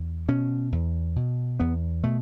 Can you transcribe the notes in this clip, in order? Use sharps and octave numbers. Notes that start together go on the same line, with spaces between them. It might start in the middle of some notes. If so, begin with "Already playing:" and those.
Already playing: E2
B2 C#4
E2
B2
E2 B3
B2 A3